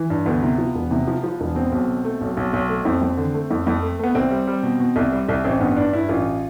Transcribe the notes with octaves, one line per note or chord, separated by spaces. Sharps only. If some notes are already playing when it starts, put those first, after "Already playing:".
Already playing: E3
G2
D2 B3
C3
F3
E1
C3
F3
F3
E1
B2 C4
B1
B2
A3
B1
B1
B1
A3
F2 C4
F2
D3
A3
F2
F2
A3
A3 B3
C2 C4
G3
G3
B2
B2
C2
G3
C2
A1 C4
G2 B3
G2 D4
G2 E4
A1 F4